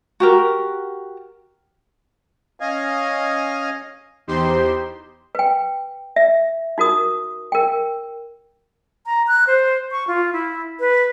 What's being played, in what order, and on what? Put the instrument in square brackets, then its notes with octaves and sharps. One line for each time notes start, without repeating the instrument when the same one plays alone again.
[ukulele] F#4 G4 A#4
[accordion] C#4 D#5 F5 G#5
[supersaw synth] E2 D#4 G4 C5 C6
[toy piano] B4 G5
E5
D#4 F#4 A#4 D#6
A#4 G5
[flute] A#5
F#6
C5
C#6
F4
E4
B4